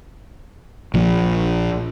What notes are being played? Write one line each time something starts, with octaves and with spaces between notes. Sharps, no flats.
A#1 F3